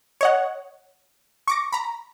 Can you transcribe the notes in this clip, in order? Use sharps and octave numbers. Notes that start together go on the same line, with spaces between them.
C#5 D#5 F#5
C#6 D6 A#6
A#5 B5